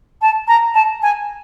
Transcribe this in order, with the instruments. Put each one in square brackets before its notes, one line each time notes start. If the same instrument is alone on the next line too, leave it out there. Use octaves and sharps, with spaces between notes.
[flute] A5
A#5
A5
G#5